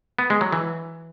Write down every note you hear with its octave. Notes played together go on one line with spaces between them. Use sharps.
B3
G#3
F#3
E3